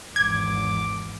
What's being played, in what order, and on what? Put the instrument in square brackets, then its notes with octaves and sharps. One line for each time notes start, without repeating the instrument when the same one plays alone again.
[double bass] G#1 E2 [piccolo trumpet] D6 [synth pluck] G#6